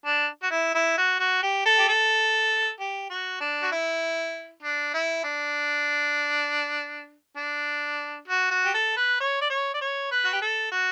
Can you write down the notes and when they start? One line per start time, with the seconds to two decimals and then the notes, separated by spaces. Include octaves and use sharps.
0.06 D4
0.43 F#4
0.51 E4
0.74 E4
0.98 F#4
1.20 F#4
1.43 G4
1.65 A4
1.78 G4
1.88 A4
2.80 G4
3.10 F#4
3.40 D4
3.63 F#4
3.72 E4
4.63 D4
4.94 E4
5.24 D4
7.37 D4
8.28 F#4
8.51 F#4
8.65 G4
8.74 A4
8.97 B4
9.20 C#5
9.41 D5
9.50 C#5
9.74 D5
9.81 C#5
10.11 B4
10.25 F#4
10.33 G4
10.42 A4
10.72 F#4